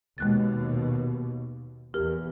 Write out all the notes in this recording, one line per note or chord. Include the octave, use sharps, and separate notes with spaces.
D#2 B2 G#3 F#6 A6
E2 G4 A#4